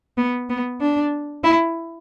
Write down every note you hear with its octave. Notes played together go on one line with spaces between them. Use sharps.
B3
B3
D4
E4